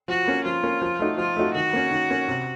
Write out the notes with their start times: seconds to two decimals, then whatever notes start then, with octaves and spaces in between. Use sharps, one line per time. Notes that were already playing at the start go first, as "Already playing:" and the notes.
0.08 F3 F#4
0.27 A#3 C#4
0.45 F3 F4
0.63 A#3 C#4
0.82 F3
0.99 A3 D#4 F#4
1.18 F3 F4
1.36 A3 D#4 F#4
1.54 D#3 F#4
1.73 A#3 C#4
1.91 D#3
2.10 A#3 C#4
2.28 C3